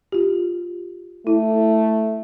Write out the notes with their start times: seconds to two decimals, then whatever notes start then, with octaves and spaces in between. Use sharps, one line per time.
0.12 F4 G4
1.27 A3 E4